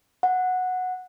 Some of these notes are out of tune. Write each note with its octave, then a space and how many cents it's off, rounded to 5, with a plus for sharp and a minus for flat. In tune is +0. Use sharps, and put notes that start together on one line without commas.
F#5 -10